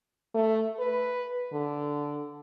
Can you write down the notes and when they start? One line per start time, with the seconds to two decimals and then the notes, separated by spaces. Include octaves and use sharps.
0.35 A3
0.79 B4
1.53 D3